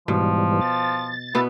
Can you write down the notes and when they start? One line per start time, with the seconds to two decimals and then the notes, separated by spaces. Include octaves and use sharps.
0.08 G#2 B2 E3 F3 G3
0.61 A6
1.35 B2 B3 E4